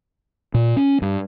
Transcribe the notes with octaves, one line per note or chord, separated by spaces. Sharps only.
A#2
C#4
G2